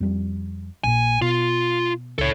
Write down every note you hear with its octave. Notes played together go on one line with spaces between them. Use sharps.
F2 G3
A#1 A#2 G#5
B2 F4
C#2 A4 C#5